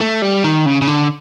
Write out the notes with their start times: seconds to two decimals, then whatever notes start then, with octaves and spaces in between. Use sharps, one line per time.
0.01 A3
0.22 G3
0.44 D#3
0.66 C#3
0.82 C#3
0.87 D3